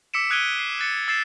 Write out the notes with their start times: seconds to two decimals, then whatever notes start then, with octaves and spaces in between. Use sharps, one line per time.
0.14 D6 E6 B6 C#7 D7 E7
0.30 D#6 F#6 G#6 D7 D#7 G7
0.59 C7
0.79 F#6 A6 C#7
1.08 E6 A6 C7 E7